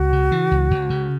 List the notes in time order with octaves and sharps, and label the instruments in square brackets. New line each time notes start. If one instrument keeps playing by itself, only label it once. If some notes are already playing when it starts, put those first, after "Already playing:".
Already playing: [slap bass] C#2 [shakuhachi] F#4
[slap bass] C#3
E3
C#2
C#2
C#3